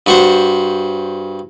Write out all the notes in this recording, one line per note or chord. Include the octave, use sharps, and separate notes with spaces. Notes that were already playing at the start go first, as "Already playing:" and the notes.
G2 F#4 C5